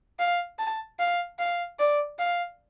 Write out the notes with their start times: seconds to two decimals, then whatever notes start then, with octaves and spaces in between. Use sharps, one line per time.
0.19 F5
0.59 A5
0.99 F5
1.39 F5
1.79 D5
2.19 F5